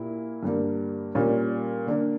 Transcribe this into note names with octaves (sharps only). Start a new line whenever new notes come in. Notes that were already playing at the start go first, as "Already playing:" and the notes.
Already playing: A#2 A#3 E4 G4
G2 D3 G3 A#3
A#2 G3 C#4
D3 A#3 D4